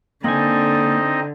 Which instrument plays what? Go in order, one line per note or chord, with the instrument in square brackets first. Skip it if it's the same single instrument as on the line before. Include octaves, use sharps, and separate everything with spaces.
[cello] D3 [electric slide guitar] A#3 G#5 [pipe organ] C4 D#4 D#5